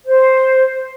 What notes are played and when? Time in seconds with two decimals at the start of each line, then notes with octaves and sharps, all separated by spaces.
0.06 C5